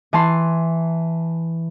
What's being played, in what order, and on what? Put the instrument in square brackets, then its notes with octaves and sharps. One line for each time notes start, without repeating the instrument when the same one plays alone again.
[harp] E3 A5 C6